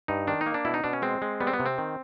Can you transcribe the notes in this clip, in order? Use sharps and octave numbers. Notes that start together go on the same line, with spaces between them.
G2 D#4
D#3 D4
D#4
A#3
D4
B2 E4
D#4
B2 D4
C#4
G#3 C4
G#3
G3 B3
C4
B3
C3
C4
D#3